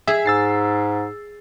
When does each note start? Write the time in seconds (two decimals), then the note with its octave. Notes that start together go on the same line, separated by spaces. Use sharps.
0.07 G#4 E5
0.26 G#2 E6 A6 C7